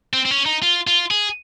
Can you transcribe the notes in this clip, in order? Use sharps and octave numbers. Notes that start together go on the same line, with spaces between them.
C4
C4
C#4
D#4
F4
F4
G#4